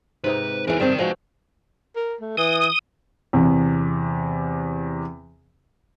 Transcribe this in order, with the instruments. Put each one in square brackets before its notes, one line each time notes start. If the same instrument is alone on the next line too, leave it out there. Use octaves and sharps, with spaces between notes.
[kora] G#2 C3 D#4 [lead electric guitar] B4
[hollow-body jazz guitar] E2 E3 [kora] G#3 [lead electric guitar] A#4 B4
[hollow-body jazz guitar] G2 C4 [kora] G3 C5 [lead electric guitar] A#4 G5
[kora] F3 C4 F#4 [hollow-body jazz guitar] G#3 [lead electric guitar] B4 F5
[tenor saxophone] A#4
A3
[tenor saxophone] E3 [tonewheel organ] D#6
[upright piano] E2 C3